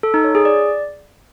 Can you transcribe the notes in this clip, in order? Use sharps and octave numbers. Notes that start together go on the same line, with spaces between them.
A4
D#4
C#5
G#4
D5